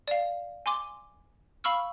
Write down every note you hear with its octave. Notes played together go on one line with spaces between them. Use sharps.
D5 F5
G#5 C6 D6
F5 B5 C#6 E6 F6